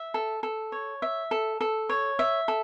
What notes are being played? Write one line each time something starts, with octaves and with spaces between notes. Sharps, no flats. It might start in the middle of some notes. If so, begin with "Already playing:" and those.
Already playing: E5
A4
A4
C#5
E5
A4
A4
C#5
E5
A4